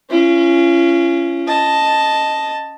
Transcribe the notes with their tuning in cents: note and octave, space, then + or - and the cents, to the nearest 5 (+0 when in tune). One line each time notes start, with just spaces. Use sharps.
C#4 +0 F4 -40
D#5 +0 A5 +0